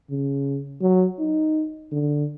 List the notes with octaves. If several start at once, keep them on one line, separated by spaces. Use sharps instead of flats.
C#3
F#3
D#4
D3